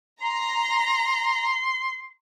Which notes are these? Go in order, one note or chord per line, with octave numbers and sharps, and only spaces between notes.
A#5 C6